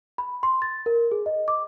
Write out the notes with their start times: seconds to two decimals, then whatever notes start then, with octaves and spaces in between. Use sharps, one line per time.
0.18 B5
0.43 C6
0.62 A6
0.86 A#4
1.12 G#4
1.26 D#5
1.48 D6